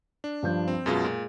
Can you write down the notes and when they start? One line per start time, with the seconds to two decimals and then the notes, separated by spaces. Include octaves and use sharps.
0.24 D4
0.43 G2 F3 G6
0.68 C4
0.86 F#2 B2 G#3 F4
1.04 A#2